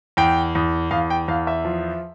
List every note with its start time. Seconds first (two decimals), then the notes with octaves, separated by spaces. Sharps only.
0.17 E2 G5
0.55 E2
0.91 E2 F5
1.10 G5
1.28 E2 F5
1.47 E5
1.65 F3